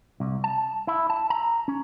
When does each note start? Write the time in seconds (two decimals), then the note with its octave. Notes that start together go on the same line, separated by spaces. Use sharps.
0.20 C2
0.44 A5
0.87 E4
1.10 A5
1.30 A#5
1.68 C#4